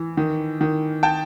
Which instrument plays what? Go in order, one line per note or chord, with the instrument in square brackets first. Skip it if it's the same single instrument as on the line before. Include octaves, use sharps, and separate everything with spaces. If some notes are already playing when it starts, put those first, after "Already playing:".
Already playing: [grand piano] E3
D#3
D#3
G5 A5